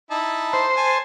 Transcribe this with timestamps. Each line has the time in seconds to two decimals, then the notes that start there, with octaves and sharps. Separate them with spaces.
0.11 D#4 E4 A5
0.53 C5
0.77 G#5 A5